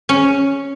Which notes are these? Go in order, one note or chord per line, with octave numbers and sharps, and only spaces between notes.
C#4